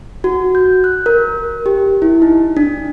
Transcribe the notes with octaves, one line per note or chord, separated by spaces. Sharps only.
F#4
G6
F#6
A#4
G4
E4
D#4
D4